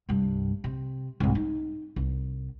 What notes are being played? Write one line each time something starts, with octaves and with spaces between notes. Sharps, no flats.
C2 G2
C3
C2 G#2
D#4
C2